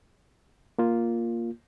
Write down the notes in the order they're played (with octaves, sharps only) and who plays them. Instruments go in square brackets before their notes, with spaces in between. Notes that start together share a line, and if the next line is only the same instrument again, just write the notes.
[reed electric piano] A#3 F4